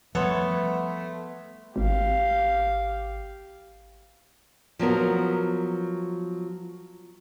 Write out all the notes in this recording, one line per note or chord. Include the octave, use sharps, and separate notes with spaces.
F3 G3 A3 B3 A4 B4 C#5 C6
G#1 G4 F5
F3 F#3 B3 A#4